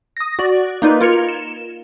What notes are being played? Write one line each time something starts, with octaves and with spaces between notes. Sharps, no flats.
D#6 A#6
F#4 D5
A#3 D#4 F4 B4
F4 A#4 G#6 C#7 F7
E7